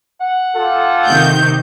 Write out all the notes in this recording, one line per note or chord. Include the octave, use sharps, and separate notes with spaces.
F#5
F4 G4 A4
C3 D#3 G6